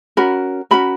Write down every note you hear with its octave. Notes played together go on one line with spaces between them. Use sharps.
C#4 F#4 A#4 B5
C#4 F#4 A#4 B5